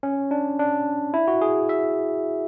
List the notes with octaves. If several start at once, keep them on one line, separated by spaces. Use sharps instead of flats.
C#4
D4
D4
E4
F#4
G#4
E5